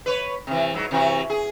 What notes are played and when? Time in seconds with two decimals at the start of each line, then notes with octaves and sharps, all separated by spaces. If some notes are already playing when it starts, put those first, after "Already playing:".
0.06 B4 C#5
0.47 C3 E3
0.74 G#2 F#3
0.91 C3 E3 F#4
1.30 G#4